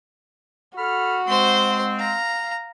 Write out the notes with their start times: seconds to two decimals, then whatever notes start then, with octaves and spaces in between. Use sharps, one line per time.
0.78 F#4 A4 B5 F6
1.28 G#3 C4 C5 C6
1.99 F5 A#5